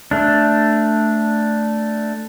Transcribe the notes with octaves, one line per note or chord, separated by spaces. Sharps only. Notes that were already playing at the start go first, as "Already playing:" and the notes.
A3 D4